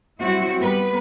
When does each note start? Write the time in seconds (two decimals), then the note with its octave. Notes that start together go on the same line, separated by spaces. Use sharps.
0.20 F#3 G3 C4 E4 F#4
0.58 G3 B3 B4